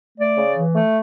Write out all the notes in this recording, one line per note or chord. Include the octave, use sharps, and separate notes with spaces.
A3 D5
C#3
E3
A3